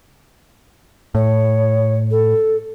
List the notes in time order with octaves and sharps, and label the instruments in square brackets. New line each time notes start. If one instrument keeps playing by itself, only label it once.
[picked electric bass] A2 [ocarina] C#5
[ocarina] A4